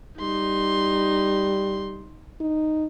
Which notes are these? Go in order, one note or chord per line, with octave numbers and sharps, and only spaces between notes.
G3 D#4 C6
D#4